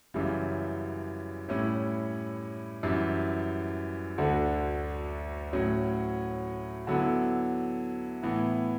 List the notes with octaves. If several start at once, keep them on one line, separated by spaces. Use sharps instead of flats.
F#2 C#3 E3 G3
A2 G3 C#4 E4
F#2 E3 G3
D2 D3 A3 D4 F#4
A2 F#3 C#4 F#4
D3 F#3 B3 E4
A2 E3 B3